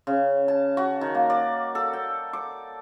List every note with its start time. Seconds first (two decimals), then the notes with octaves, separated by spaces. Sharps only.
0.07 C#3
0.48 A5
0.77 F#4
1.01 D#3
1.15 A#3
1.30 D5
1.75 A4
1.93 G5
2.33 D6